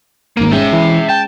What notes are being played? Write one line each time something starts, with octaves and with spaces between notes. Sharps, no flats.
G#1 A#3 D#7
G#3 C#4 E5 G5
E3
G5 A5